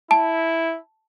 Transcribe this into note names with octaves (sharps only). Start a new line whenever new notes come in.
E4 A5